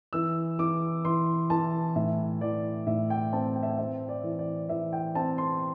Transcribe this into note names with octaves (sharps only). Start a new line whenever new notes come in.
E3 E6
E3 D6
E3 C6
E3 A5
A2 E5
E3 D5
A2 E5
G5
C4 A5
G5
E5
G5
C4 E5
D5
E3
D5
E3 E5
G5
C4 A5
C6